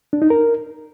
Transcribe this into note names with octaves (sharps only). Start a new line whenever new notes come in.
D4
D#4
A#4